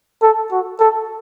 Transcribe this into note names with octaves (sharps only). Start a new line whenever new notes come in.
A4
F#4
A4